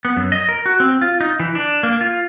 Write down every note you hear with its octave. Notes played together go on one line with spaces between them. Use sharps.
B3
F#2
D#5
A#4
F#4
C4
F4
D#4
E3
D4
A#3
F4